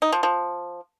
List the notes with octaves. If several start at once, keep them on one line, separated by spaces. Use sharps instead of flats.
D#4
F3
F3